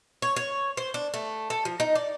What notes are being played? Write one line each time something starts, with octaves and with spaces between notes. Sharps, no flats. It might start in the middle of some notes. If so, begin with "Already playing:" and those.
C#5
C#5
C5
D4
A3
A4
F3
D#4
D5